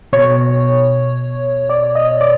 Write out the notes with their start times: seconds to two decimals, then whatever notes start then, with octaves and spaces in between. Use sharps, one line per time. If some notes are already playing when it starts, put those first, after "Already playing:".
0.13 B2 C#5
1.69 D5
1.95 D#5
2.21 D5